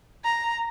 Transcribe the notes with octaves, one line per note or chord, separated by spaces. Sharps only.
A#5